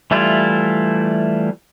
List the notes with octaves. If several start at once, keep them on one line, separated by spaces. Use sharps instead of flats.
E3 G3 A3 E4 F4